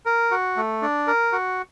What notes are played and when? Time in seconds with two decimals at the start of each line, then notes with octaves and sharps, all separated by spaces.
0.06 A#4
0.31 F#4
0.56 A3
0.82 D4
1.07 A#4
1.32 F#4